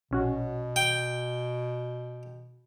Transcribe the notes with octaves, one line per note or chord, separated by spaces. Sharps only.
A#1 B2 C#4 F#4
G5